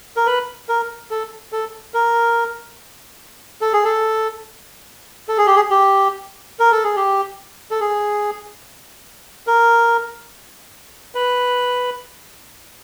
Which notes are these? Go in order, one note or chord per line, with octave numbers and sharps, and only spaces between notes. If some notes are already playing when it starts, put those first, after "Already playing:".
A#4
B4
A#4
A4
A4
A#4
A4
G#4
A4
A4
G#4
G4
G#4
G4
A#4
A4
G#4
G4
A4
G#4
A#4
B4